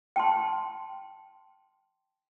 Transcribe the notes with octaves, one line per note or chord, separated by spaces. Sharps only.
G5 A5 C6